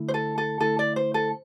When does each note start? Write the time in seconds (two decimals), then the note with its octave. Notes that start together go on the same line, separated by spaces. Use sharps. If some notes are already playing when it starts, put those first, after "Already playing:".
Already playing: D3 A3 E4
0.08 C5
0.14 A4
0.38 A4
0.60 D3 A3 E4 A4
0.79 D5
0.96 C5
1.14 A4